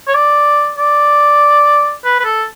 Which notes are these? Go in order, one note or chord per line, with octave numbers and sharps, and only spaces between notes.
C#5
D5
D5
B4
B4
A4